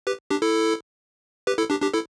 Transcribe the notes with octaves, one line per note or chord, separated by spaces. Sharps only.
G4 B4
D4 G4
E4 A4
G4 B4
E4 A4
D4 G4
D4 G4
E4 A4